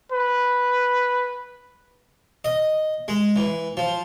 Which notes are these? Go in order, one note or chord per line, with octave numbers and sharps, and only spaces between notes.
B4
D#5
G#3
E3
F3